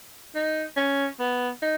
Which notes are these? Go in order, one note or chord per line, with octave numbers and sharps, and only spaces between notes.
D#4
C#4
B3
D#4